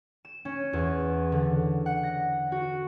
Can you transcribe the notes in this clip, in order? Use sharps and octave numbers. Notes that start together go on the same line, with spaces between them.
E7
C#4
E2
D3
F#5
A#6
F#4